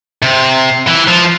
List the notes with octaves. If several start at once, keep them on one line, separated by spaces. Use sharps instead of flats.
C3
E3
F3